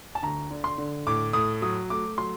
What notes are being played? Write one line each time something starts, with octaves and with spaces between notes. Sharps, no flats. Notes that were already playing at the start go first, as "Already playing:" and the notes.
A5
D2 A#5
D3
C6
D3
A2 D6
A2 D#6
F#3 D#6
A3 D6
F#3 C6